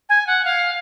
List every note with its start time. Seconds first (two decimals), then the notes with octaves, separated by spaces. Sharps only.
0.09 G#5
0.27 F#5
0.45 F5